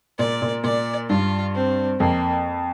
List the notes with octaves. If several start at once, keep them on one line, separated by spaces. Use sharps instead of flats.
A#2 D5
A#2
A#2 D5
G2 F4
C4
F2 A#3